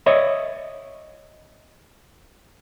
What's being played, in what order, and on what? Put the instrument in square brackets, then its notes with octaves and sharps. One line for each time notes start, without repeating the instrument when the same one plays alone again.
[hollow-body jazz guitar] C#5 D#5 E5